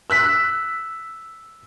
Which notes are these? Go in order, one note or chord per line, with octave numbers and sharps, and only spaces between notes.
E6 F#6 B6